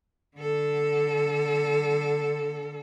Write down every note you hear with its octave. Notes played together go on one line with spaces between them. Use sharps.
D3 A4